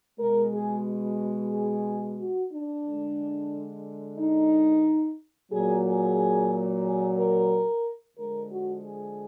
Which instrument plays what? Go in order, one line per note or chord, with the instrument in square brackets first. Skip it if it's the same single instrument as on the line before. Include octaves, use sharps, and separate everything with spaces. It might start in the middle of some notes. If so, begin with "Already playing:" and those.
[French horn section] B2 G#3 A#4
G#4
G#4
F#4
D4
D3 G#3
D#4
A#2 F#3 G#4
G#4
G#4
A#4
D3 F3 G#3 A#4
F#4
G#4